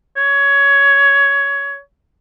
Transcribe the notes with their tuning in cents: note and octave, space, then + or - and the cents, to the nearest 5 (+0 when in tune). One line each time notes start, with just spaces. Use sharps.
C#5 +15